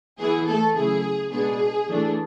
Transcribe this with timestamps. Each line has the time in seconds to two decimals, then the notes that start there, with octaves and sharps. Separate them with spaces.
0.18 E3 B3 E4 G#4
0.47 A3 A4
0.74 C#3 F#3 A3 E4 G#4
1.31 B2 G#3 B3 D4 G#4
1.87 E3 A3 D4